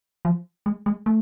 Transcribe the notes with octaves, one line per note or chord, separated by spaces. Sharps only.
F3
G#3
G#3
A3